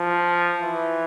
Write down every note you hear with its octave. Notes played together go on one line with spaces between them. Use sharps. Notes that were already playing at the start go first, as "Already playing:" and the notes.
Already playing: F3
E3